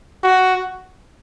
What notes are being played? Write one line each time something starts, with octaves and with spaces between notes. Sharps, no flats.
F#4